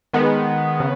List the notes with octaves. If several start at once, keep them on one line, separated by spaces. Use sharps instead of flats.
D#3 G#3 B3
C#3